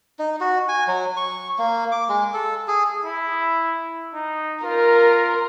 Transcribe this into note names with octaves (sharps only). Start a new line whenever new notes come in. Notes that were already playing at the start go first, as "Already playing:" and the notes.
D#4
F#4
G#5
F#3
C#6
A#3
D6
G#3
A4
G#4
E4
D#4
F4 A#4